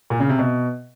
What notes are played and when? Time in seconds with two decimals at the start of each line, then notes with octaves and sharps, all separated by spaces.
0.10 A#2
0.20 C#3
0.29 C3
0.39 B2